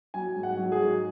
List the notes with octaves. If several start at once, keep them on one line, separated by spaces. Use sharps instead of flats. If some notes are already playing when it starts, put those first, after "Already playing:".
F#3 G#5
G#2
F#5
F#3
G#4
G#2